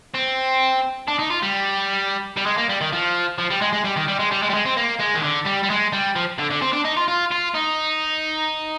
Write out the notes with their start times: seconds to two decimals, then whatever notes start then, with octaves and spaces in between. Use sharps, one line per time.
0.15 C4
1.08 D4
1.19 D#4
1.30 F4
1.42 G3
2.37 G3
2.46 G#3
2.57 A#3
2.69 G3
2.81 D#3
2.93 F3
3.38 F3
3.50 G3
3.61 G#3
3.73 G#3
3.85 G3
3.96 D#3
4.08 G3
4.19 G#3
4.31 G3
4.42 G#3
4.50 G3
4.54 G#3
4.65 C4
4.77 A#3
5.00 G#3
5.15 D#3
5.23 D3
5.46 G3
5.64 G3
5.70 G#3
5.93 G3
6.16 F3
6.39 D3
6.51 D3
6.62 C4
6.73 D4
6.85 D#4
6.97 F4
7.08 F4
7.31 F4
7.54 D#4